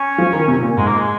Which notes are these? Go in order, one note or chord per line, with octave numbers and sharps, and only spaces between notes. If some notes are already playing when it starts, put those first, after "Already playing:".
Already playing: C#4
F3
D#3
C3
A#2
G#2 G#3
A#3
G#3